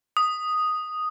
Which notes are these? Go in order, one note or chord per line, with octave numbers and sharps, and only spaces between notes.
D#6